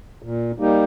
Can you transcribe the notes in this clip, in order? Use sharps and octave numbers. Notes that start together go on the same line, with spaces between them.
A#2
G3 A#3 D#4 G4